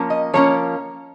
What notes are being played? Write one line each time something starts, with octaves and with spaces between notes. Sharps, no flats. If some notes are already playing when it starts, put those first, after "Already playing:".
Already playing: F3 A#3 C#4
D#5
F3 A#3 C#4 C#5